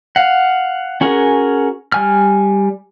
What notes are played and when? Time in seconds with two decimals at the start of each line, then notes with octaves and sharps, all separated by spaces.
0.16 F5 F#5
1.01 C#4 F#4 G#4 A#4
1.92 G3 G#5 F6